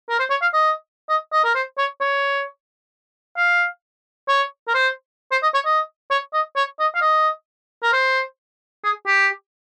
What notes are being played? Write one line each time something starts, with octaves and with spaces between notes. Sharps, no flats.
A#4
C5
C#5
F5
D#5
D#5
D#5
A#4
C5
C#5
C#5
F5
C#5
A#4
C5
C5
D#5
C#5
D#5
C#5
D#5
C#5
D#5
F5
D#5
A#4
C5
G#4
G4